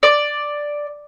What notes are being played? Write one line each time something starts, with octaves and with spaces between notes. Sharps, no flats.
D5